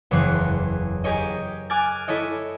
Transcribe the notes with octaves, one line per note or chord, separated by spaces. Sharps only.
F#1 E2 E3 C#5 F#6 C7
G4 G#4 A#4 C#5 D#5
G#5 D6 F6 F#6 G#6 A6
E4 A4 C#5 D#5